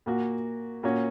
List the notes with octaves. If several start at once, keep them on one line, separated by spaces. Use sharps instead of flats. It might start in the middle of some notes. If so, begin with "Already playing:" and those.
A#2 A#3 F#4
A#2 A#3 C#4 F#4